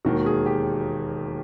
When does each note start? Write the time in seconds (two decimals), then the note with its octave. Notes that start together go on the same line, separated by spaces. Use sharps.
0.05 E1 D#2 D#3 F#4
0.26 G#4
0.46 G4